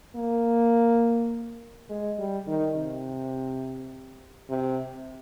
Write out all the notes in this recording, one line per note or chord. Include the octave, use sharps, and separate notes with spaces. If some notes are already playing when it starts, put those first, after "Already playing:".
A#3
G#3
G3
D#3
C3
C3